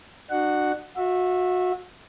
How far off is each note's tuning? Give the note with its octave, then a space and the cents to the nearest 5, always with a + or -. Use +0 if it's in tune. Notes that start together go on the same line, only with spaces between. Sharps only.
D4 +40 F#4 +0 F#5 +0
F#4 -30 E5 +0